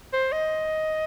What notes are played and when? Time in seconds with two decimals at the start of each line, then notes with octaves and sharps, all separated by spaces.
0.13 C5
0.32 D#5